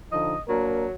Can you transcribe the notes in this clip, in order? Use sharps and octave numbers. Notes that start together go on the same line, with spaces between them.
D3 F3 D#4 D#5
F#3 A#3 D4 A#4